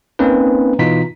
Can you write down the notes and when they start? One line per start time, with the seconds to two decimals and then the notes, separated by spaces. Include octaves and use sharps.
0.19 A#3 C4 C#4 D#4 B4
0.79 B2 E3 D#4 F4 B6